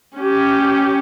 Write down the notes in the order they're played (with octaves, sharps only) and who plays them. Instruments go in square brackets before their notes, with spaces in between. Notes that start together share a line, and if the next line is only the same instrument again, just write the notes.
[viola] C#4 G4